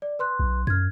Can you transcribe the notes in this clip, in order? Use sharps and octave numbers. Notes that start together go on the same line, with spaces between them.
D5
B4 C6 F#6
B1
F#2 F6 G#6